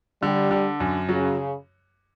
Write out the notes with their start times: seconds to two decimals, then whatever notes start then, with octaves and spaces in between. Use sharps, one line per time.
0.22 D3 G3
0.51 D3
0.80 F#2
1.09 C#3 F#3